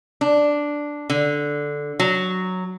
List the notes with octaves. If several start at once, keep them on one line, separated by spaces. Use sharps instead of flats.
D4
D3
F#3